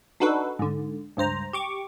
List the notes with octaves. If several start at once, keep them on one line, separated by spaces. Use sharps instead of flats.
D4 D#4 F#4 A4 B4
G#2 D3
C#2 G2 C5 A#5
G4 C#6 D6